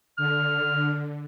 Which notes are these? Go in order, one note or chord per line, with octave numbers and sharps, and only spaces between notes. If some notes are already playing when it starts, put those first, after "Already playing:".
D3 F6